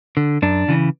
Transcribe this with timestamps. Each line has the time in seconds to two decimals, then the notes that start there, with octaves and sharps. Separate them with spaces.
0.17 D3
0.42 F#2 D4
0.68 C#3 E3